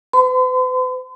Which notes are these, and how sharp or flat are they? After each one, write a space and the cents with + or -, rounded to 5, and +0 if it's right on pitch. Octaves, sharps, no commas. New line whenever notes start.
B4 +45 C6 -45